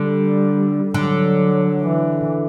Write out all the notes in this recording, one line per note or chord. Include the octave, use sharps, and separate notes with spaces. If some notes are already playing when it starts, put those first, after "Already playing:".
Already playing: D3 G3
D3 F#3
E3